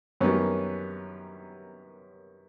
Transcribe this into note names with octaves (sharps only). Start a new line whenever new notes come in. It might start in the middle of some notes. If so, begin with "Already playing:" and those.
F#2 D#3 G3 B3 C#4